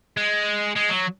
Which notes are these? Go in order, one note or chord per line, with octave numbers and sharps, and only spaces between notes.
G#3
G#3
F#3